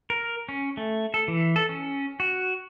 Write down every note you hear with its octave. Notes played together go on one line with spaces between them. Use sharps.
A#4
C#4
A3
A4
E3
A4
C#4
F#4